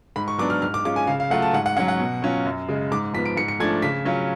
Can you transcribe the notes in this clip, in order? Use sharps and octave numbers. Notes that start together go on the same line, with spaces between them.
G#2 B5
C#6
F#3 B3 D4 D6
F6
G#2 F6
D6
G#3 C#4 F4 D6
G#5
C#3 F5
F5
F#3 A3 F4 F#5
A5
G#2 F#5
F#5
F#3 C#4 F#5
F#5
B2
F#3 C#4 F4
F#2
C#3 G#3
G#2 D6
F3 B3 B6
D7
G#2 C#7
C#7
F3 A3 D4 G#6
C#3 B6
F#3 C#4 F4